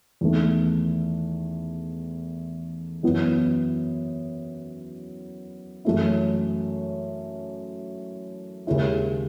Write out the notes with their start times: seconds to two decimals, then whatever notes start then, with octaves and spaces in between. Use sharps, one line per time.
0.21 E2 D#3 A3
3.03 F#2 E3 B3 E4
5.85 F#2 E3 A3 C#4 E4
8.67 D#2 C#3 G#3 C#4 E4